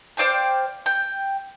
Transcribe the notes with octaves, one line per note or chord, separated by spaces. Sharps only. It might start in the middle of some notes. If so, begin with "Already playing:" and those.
C5 D5 F5 G5
G5